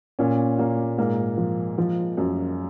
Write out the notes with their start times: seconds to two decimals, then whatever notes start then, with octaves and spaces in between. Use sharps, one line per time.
0.19 A#2 C#4
0.58 A#2 A#3
0.98 G#2 A#3
1.37 F3
1.78 F3
2.17 F#2